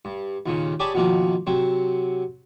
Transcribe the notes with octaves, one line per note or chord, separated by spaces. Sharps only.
G2
D#2 A#2 C#3
G4 G#4 C#5 D5 A5 B5
B2 D#3 F3 A#3
C3 F#3 C4